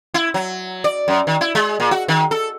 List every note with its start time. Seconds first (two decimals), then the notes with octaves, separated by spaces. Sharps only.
0.14 E4
0.34 F#3
0.84 D5
1.08 F#2
1.27 D#3
1.41 E4
1.55 G#3
1.80 A#2
1.91 F#4
2.08 D#3
2.31 A4